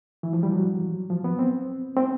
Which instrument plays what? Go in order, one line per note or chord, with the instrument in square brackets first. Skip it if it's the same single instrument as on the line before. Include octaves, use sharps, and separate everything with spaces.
[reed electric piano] E3
F3
G3
F#3
F3
B3
C4
C4